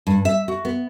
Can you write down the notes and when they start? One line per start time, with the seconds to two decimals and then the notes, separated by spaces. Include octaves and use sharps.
0.07 G2
0.25 E5
0.48 F#4
0.65 B3